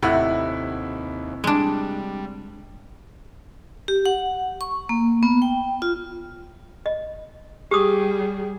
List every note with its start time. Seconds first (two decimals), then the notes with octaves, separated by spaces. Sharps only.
0.03 D#2 A2 C3 E4 F#5
1.44 G3 G#3 D4
3.88 G4
4.06 F#5
4.61 C#6
4.89 A#3
5.23 B3
5.42 G5
5.82 F4
6.86 D#5
7.71 G3 G4 G#4 D6 D#6